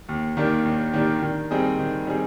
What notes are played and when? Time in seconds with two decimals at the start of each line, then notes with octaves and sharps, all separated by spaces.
0.09 D#2
0.37 D#3 A#3 D4 G4
0.65 D#2
0.93 D#3 A#3 D4 G4
1.23 D#3
1.51 G3 C4 D#4 G#4
1.79 D#3
2.07 G3 C4 D#4 G#4